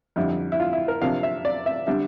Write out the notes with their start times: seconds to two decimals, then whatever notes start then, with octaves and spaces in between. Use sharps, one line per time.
0.16 F2 D3 G3 E4
0.52 E4
0.60 F4
0.73 E4
0.88 A#4
1.01 C3 F3 A#3 D4 F5
1.23 E5
1.45 D5
1.66 E5
1.87 D3 G3 D4 E5